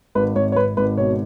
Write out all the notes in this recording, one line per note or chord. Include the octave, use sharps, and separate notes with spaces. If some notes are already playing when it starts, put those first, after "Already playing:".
G#1 B4
G#1 C#5
C#5
G#1 B4
G#1 B4
B2 C#5